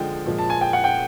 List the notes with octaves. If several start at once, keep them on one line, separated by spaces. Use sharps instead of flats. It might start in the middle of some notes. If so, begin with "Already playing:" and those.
Already playing: D3 F3 G#3 G5
A#2 F3 G#3
A5
G#5
G5
F#5
G5